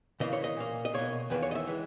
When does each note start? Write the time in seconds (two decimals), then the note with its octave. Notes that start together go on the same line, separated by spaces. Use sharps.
0.20 C#3 E3 A#3 D#5
0.33 C#5
0.44 D#5
0.57 A#2 A#3
0.85 D#5
0.94 B2 A#3 C#5
1.30 E2 D#3 A#3 B4
1.43 C#5
1.51 D#5
1.55 E5
1.67 E3 G#3